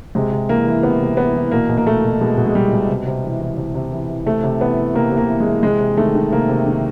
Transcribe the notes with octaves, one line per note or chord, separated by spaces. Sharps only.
C3 G#3
C3
E3 A#3
E3
C3 B3
C3
E3 B3
E3
B2 A#3
B2
A#3
B2 A3
B2
B2 G#3
B2
G#3
B2 G3
B2
C3
C3
E3
E3
C3
C3
E3
E3
C3 A3
C3
E3 B3
E3
C3 A#3
C3
A#3
E3
G#3
E3
C3 G#3
C3
D#3 A3
D#3
C3 A#3
C3
D#3